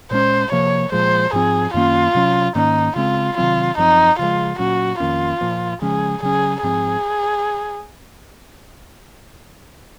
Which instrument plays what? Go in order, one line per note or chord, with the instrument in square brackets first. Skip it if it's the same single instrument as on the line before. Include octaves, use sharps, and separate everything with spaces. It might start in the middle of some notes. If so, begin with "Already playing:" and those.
[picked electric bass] A#2 G#3 C#4 [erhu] C5
[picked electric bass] C3 F3 A#3 [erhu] C#5
[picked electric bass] A#2 F3 G#3 [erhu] C5
[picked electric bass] G#2 F3 C4 [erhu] G#4
[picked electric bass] F#2 D#3 A#3 C#4 [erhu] F4
[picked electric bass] C3 F#3 C#4
[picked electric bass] G#2 D#3 A#3 C#4 [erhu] D#4
[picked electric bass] C#3 G#3 C4 [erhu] F4
[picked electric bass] C3 D#3 F#3 C4 [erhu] F4
[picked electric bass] F#2 F3 C4 [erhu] D#4
[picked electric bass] C#3 F3 G#3 [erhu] F4
[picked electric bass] A#2 F#3 C#4 [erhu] F#4
[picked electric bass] F2 D#3 A#3 C#4 [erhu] F4
[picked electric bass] A#2 F3 A#3
[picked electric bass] C#3 F3 G#3 C#4 [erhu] G#4
[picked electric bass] C#3 F#3 C#4 [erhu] G#4
[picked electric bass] G#2 F3 C4 [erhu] G#4